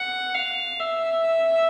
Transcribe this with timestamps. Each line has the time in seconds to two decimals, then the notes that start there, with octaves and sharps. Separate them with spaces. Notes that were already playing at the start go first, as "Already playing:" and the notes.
Already playing: F#5
0.35 F5
0.79 E5